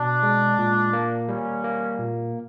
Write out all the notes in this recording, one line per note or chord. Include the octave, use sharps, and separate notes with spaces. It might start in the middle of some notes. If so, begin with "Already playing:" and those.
Already playing: B2 D4
G#3
A#2
A#3
G3 C#4
A#3
A#2